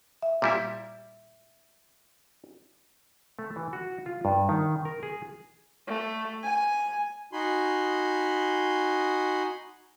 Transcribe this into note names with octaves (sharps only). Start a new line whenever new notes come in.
E5
A#2 G3 E4
A3
E3
F#4
F4
G2
D#3
A#4
G#4
A3
G#5
D#4 F#4 G#5 B5 C6